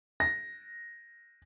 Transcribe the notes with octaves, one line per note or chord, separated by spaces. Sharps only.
A#6